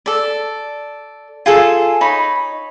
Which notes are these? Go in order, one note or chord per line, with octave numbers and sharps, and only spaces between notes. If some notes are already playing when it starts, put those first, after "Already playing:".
A4 D5
F4 G#4 A4
D#4 C#5 B5